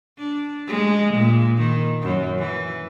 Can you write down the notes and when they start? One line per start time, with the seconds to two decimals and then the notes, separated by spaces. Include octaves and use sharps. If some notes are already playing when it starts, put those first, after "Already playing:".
0.18 D4
0.68 G#3
1.14 A#2
1.58 D#3
2.02 F#2
2.38 E3